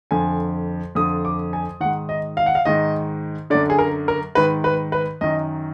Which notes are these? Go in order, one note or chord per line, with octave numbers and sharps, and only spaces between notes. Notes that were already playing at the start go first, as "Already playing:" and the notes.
F2 D3 G#5
F2 D3 D#6
D6
G#5
G#2 D#3 F#5
D#5
F5
F#5
F5
G#2 D#3 D#5
F#2 D3 D5
G#4
A#4
A#4
G#2 D#3 B4
B4
B4
F#2 D#3 D#5